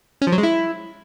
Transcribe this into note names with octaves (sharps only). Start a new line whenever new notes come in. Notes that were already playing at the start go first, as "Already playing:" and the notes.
C#4
F3
F#3
G#3
E4